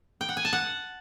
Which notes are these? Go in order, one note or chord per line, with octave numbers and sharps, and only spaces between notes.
G5
F#5
G#5
A5
F#5